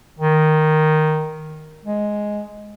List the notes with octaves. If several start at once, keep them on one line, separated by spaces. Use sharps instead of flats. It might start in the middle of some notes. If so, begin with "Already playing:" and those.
D#3
G#3